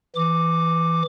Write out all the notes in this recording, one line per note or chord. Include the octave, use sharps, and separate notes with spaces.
E3 D6